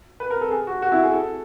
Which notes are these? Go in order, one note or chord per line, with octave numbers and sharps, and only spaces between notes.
B4
A#4
A4
G#4
F#4
F#4
E4
G#4
A4